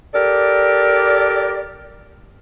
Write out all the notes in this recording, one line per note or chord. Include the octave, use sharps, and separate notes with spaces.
G4 A4 A#4 D5